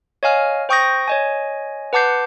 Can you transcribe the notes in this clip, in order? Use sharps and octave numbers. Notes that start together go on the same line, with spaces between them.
C#5 D#5 F5 G#5 F6
C5 G5 C#6 D#6 G6 A#6
C#5 D#5 G#5
B4 F#5 A5 D6 G6 C7